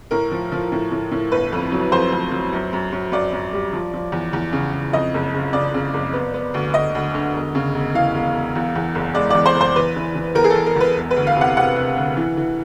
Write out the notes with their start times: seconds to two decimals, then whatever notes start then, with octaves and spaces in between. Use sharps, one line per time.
0.11 A2 A#4
0.31 F3
0.52 F3
0.72 A2
0.91 A2
1.12 A2
1.32 G1 B4
1.52 F2
1.72 F#3
1.92 F2 C5
2.12 F2
2.32 F#3
2.53 F#2
2.73 F#2
2.92 F#2
3.12 F#2 D5
3.32 F#2
3.53 G3
3.73 F3
3.93 F3
4.12 E2
4.33 E2
4.53 C#3
4.73 C#3
4.93 F2 D#5
5.14 F#1
5.34 C#3
5.53 C#3 D5
5.74 C#3
5.93 F#1
6.13 B3
6.34 B3
6.54 D2
6.74 D2 D#5
6.95 D2
7.14 D3
7.34 E1
7.55 C#3
7.74 E1
7.94 E3 F5
8.14 E1
8.35 E1
8.55 E2
8.75 E2
8.95 F#1
9.15 G#3 D5
9.30 E2 D5
9.46 C5
9.55 F#1
9.61 C5
9.76 E2 B4
9.96 E3
10.15 E3
10.35 E2 A#4
10.44 G#4
10.50 A4
10.55 E2
10.66 A#4
10.76 E2 B4
10.96 E1
11.11 B4
11.16 D2
11.27 F5
11.36 C3 F#5
11.56 C3 F#5
11.76 C3
11.96 D2
12.17 E3
12.37 E3